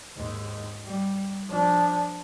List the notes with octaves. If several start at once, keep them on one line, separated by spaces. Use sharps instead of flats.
D#2 G#2
G3
F3 D4